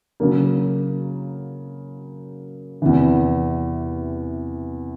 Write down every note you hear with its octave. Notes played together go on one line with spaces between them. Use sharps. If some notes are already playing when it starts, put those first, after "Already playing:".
C#3 F#3 A#3
E2 C3 E3